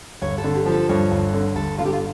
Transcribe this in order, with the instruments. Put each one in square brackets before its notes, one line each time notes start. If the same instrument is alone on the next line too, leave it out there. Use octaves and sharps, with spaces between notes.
[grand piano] G1 [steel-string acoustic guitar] C#5
[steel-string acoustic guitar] A4
[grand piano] D3
[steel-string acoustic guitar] G4
[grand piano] F3
[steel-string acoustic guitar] A4
[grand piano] G2 [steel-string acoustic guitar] C#5
[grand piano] G1
D3
[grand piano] G1 [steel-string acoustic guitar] A4
[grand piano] D3 [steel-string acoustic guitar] F4
[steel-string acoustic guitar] G4
F4